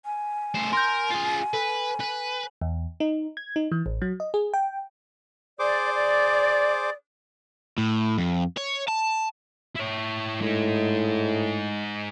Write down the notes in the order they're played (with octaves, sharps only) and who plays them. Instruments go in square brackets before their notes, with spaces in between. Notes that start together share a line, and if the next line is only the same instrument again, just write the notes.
[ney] G#5
[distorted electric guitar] A2 C5
[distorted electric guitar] A#4 [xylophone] C6 G6
[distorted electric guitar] F4 G#4
[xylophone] A4 [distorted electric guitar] B4
[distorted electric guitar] B4
[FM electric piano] E2
D#4
G#6
D#4
E3
A1
F#3
D#5
G#4
G5
[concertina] G#4 C5 D6 [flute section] D5
[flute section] D5
[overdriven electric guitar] A2
F2
C#5
A5
[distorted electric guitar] E4 C#5
[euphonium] A2 [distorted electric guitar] G#3 D#4